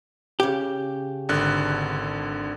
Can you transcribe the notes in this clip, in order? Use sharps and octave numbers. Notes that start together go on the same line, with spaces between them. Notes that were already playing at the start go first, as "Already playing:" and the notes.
C#3 G4
G#1 D3 F#6